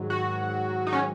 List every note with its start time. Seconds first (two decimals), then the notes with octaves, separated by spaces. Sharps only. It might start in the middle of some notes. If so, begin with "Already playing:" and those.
Already playing: G#2 D#3 F#3
0.10 F#4
0.87 D#4
0.93 C#4